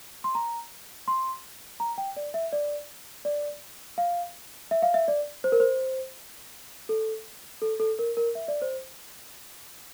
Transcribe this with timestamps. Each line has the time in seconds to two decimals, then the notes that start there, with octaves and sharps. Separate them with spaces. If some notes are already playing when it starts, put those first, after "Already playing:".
0.24 C6
0.35 A#5
1.08 C6
1.80 A#5
1.98 G5
2.17 D5
2.34 E5
2.52 D5
3.25 D5
3.98 F5
4.71 E5
4.83 F5
4.94 E5
5.08 D5
5.44 C5
5.52 A#4
5.60 C5
6.89 A4
7.62 A4
7.80 A4
7.99 A#4
8.17 A#4
8.35 E5
8.48 D5
8.62 C5